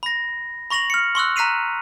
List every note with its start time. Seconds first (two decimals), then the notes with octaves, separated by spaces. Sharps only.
0.03 B5 A#6
0.70 B5 C#6 A#6 F7 F#7
0.90 F6 C#7
1.15 C6 C#6 E6 F#6
1.36 A#5 F#6 B6 C7 D#7 F7